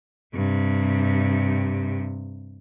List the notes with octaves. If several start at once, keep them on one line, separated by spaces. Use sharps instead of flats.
G2 C3